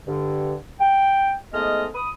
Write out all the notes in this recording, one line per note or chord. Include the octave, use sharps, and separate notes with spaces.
G2 D3
G5
G#2 G#3 A3 B3 D#5 F6
B5 D#6